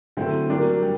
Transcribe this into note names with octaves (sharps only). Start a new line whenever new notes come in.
D3 F#3 A3 C4 E4
F#3 A#3 D4 G4
G3